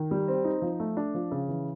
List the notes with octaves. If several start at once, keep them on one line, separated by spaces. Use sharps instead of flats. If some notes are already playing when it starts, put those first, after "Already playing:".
Already playing: D#3
G3
C4
D#4
F3
A3
D4
F3
C#3
E3